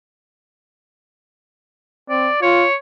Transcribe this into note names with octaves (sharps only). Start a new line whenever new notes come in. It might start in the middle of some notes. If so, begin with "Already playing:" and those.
C4 D5
F4 C#5